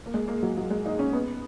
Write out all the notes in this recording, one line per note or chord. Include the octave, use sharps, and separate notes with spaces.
A#3
G#3
A#3
F#3
F#3
G#3
D#4
C#4
B3